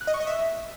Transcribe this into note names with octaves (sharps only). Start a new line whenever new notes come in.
F#6
D#5
C#6
D#5
E5